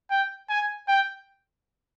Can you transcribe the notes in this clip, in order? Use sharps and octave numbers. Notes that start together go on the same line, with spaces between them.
G5
G#5
G5